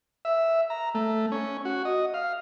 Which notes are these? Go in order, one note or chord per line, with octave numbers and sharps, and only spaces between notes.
E5
A#5
A3
C#4
F#4
D#5
F5